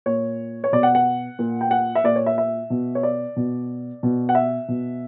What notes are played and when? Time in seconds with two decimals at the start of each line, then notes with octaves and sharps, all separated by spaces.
0.06 A#2 C#5
0.64 C#5
0.72 B2 D5
0.83 F#5
0.95 F#5
1.39 A#2
1.61 G5
1.71 F#5
1.95 E5
2.04 A#2 D5
2.16 C#5
2.26 E5
2.38 E5
2.70 B2
2.95 C#5
3.03 D5
3.36 B2
4.03 B2
4.29 F#5
4.35 E5
4.68 B2